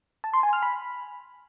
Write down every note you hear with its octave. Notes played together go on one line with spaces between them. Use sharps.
A5
C6
G#5
F6
B5